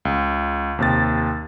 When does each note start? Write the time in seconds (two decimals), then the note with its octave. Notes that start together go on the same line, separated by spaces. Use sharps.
0.05 C#2
0.79 D#2 C3 A6